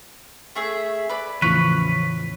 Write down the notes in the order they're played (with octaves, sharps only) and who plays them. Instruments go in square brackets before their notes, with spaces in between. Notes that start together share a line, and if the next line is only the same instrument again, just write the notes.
[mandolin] A3 G#4 E5
B4 D5
[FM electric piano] E2 A2 C#3 [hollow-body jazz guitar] E3 F3 [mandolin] C#4 [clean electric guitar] B4